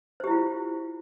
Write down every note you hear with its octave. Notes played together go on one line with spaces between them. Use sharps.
E4 F4 G4 C5